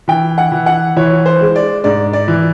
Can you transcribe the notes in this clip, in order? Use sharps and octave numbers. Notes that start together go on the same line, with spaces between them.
E3 G5
F#5
E3
F#5
E3 C#5
C5
G#3
D5
G#2 D5
D5
E3